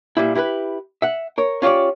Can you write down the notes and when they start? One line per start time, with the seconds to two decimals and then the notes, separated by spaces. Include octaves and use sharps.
0.17 A#2 G3 E4
0.35 E4 G4 A#4 B4
1.02 E5 F#5
1.38 A#4 C#5
1.62 C#4 F4 G4 C#5 D5